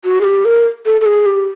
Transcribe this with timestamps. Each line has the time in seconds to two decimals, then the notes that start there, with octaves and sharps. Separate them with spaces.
0.04 F#4
0.21 G#4
0.24 G4
0.45 A#4
0.86 A4
1.01 A4
1.06 G#4
1.26 G4